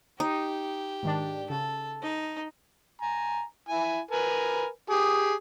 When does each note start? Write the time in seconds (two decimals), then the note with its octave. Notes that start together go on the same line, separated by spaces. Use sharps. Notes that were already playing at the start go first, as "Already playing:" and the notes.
0.20 D#4 G4
1.03 G#2 D#3 D4
1.50 C#3 A4
2.02 D#4
3.02 G#5 A#5
3.69 E4 G#5
4.11 A#4 B4 G#5
4.90 G4 G#4